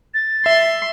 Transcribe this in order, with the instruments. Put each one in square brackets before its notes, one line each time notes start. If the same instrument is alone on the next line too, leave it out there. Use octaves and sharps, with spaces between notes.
[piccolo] A6
[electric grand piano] E5 [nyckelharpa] C6